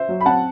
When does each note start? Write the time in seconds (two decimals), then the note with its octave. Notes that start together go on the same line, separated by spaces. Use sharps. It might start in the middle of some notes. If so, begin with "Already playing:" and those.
Already playing: C5 E5
0.08 F#3
0.21 B5
0.26 C4 F#5 A5